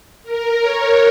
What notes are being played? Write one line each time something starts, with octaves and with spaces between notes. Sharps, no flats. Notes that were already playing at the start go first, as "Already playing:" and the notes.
A#4
C#5